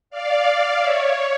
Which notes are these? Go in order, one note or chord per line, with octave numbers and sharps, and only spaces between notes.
D5 F5
C#5 E5